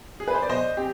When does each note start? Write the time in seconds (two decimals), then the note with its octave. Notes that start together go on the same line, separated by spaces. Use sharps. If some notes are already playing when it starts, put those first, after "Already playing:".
0.20 G#4
0.28 B4
0.35 C5
0.42 D5
0.49 B2 C5 D#5
0.77 C4 G4